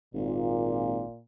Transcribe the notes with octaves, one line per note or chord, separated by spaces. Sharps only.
G#1 A#2